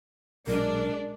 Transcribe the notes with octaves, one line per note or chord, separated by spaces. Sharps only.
B1 A#2 F#3 G#3 D4 A#4